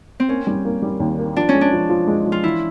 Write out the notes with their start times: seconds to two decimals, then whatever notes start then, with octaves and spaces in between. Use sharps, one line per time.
0.20 C4
0.29 A#3 C#4
0.47 G3
0.65 A#3
0.82 G3
1.00 D#2
1.19 A#3
1.36 F3 D4
1.49 G#3 C#4
1.61 D4
1.73 F3
1.90 F3
2.07 G#3
2.26 F3
2.32 F4
2.43 E3 E4